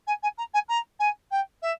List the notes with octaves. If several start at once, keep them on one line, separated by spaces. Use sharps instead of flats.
G#5
G#5
A#5
G#5
A#5
G#5
G5
E5